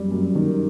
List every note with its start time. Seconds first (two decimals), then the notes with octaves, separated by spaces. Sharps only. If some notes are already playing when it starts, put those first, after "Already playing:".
Already playing: F#2 G3
0.11 F#2
0.35 D#3